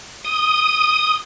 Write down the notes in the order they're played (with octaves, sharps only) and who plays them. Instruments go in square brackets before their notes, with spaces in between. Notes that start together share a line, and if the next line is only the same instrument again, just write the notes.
[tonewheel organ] D#6